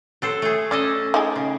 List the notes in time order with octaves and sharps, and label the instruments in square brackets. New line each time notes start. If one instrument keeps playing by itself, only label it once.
[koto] F#3 A4 C5
A3 G#4
[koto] C#4 A4 D#5 [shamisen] D5
[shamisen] D#4 G4 G#4
[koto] C#3